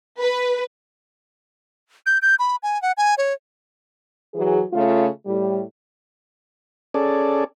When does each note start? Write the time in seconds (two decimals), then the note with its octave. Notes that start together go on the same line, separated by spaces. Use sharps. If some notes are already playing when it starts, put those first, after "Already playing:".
0.20 B4
2.06 G6
2.22 G6
2.39 B5
2.63 G#5
2.82 F#5
2.97 G#5
3.18 C#5
4.34 E3 F#3 G#4
4.72 C#3 A3 F4
5.25 A2 G3
6.94 C#4 G#4 A4 D5